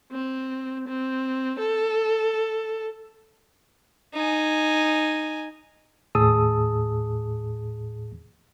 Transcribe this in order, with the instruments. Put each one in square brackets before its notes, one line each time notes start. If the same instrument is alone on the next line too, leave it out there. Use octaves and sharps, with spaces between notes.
[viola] C4
C4
A4
[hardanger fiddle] D#4 G#5
[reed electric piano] D#2 A2 G#4 A5 D#6 E6